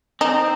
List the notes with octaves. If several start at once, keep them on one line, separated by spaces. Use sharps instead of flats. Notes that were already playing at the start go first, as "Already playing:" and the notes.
C4 D#4